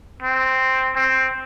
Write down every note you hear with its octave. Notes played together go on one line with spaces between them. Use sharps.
C4
C4